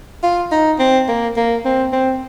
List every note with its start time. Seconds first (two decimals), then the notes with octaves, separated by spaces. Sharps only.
0.23 F4
0.52 D#4
0.79 C4
1.08 A#3
1.37 A#3
1.65 C4
1.92 C4